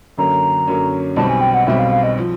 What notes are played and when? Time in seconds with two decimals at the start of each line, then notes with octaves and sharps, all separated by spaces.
0.17 F#2 D3 F#3 A#3 C#4 A#5
0.68 F#2 D3 F#3 A#3 C#4
1.16 B1 B2 G3 C4 A5
1.29 G#5
1.41 G5
1.54 F#5
1.67 B1 B2 G3 C4 E5
1.79 F5
1.91 F5
2.03 D#5
2.18 F3